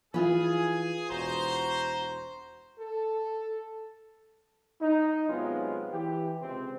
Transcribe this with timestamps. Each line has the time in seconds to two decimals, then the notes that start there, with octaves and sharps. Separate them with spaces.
0.14 E3 F4 G#4 B4 G#5
1.10 E1 F#4 C5 A#5
2.79 A4
4.81 D#4
5.28 C3 F#3 G#3 B3 F4
5.91 E3 G4
6.41 C#2 C3 C4